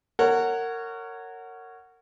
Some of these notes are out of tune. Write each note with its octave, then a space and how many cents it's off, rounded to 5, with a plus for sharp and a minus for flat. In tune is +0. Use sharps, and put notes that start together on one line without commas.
A#4 -25 C#5 +0 F#5 +0